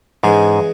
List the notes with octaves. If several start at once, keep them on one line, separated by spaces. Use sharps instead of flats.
G#2 E3 G#3 C#4 G#4